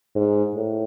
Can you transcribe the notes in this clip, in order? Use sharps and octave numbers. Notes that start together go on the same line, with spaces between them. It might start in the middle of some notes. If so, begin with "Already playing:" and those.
G#2
A2